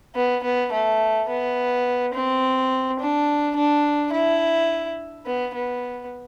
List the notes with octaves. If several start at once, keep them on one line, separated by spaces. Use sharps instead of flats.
B3
B3
A3
B3
C4
D4
D4
E4
B3
B3